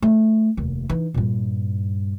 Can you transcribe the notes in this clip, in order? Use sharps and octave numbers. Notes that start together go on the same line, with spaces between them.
A3
F1 D#2
E3 D#4
G2 A#2